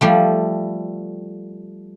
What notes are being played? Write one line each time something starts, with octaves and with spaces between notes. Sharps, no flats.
F3 G3 A3